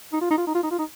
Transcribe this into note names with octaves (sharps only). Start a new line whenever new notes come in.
D#4
F4
D#4
F4
D#4
F4
D#4
F4
D#4